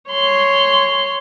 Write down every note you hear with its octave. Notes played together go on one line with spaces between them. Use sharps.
C#5 C6